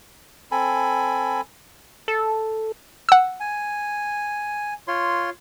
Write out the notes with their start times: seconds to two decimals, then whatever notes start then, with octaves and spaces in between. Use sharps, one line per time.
0.52 C4 A4 G#5 B5
2.08 A4
3.09 F#5 E6
3.40 G#5
4.88 F4 C#5 C6